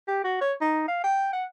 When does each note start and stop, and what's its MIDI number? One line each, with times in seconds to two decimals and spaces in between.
0.08 0.23 67
0.24 0.38 66
0.41 0.53 73
0.61 0.84 63
0.88 0.99 77
1.04 1.30 79
1.33 1.44 78